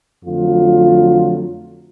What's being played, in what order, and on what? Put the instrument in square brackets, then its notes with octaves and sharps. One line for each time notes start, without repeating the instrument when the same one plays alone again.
[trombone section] F2 D3 F#3 A3 F4